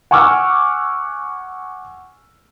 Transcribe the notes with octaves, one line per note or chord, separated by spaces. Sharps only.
F#5 G#5 C#6 D6 E6 F6